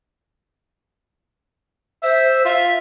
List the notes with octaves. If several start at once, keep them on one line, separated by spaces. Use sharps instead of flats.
C5 E5
F4 E5